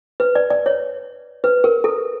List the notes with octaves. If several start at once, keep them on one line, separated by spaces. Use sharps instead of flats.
B4
D5
D5
C#5
B4
A#4
A4